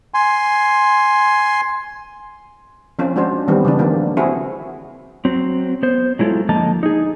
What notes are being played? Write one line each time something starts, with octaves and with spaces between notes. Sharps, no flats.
G#5 C6
F3 C4 C#4 F4
G#3 D4 F#4 C5
D#3 E3 G3 B3 C4
C#3 E3 D4
D#3 F3 A#3 D4
C4 E4 F#4 G#4
F#3 C4
B3 C5
F#3 G#3 E4 F4 A4
D3 F3 A#3 D#5 A5 A#5
D#4 G#4